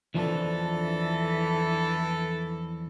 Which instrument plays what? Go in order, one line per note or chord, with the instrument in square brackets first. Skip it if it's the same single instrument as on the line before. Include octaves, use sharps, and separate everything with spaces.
[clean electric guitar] E2 F3 D4 [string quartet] E3 A4